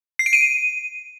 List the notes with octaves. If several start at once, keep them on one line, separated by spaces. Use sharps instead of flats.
C7
D7
D#7